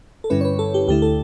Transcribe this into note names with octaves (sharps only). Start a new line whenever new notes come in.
A4
G2 D3 G3 C#4 E4 B4
C#5
B4
A4
G4
D2 D3 A3 E4 G4
A4